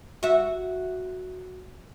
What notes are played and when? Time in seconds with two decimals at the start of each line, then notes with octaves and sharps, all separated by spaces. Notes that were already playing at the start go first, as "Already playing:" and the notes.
0.23 F#4 E5